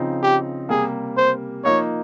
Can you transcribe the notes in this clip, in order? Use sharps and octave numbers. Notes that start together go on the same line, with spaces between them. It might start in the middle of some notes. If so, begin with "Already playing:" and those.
Already playing: C#3 F3 C4 D#4
G4
C3 G3 A#3 G#4
C5
F3 A#3 D#4 C#5